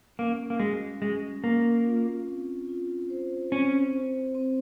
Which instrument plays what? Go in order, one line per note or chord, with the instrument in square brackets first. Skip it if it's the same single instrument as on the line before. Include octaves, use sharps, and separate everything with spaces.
[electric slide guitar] A#3 [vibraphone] C#4
[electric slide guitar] A#3
[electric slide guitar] G#3 [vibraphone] F#4
[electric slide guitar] G#3 [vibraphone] C#4
[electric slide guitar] A#3 [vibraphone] C#4
[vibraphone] F4
C4
F4
C5
[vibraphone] C4 [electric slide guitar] C#4
[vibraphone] C5
C4